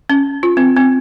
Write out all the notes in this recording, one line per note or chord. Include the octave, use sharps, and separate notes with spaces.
C#4
F4
C4
C4